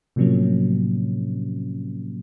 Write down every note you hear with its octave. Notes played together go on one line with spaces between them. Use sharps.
A2 C3 F3 F#3 A#3 C#4